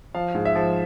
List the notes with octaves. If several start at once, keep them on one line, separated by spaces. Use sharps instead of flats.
F3 F5
G#2
E5
F3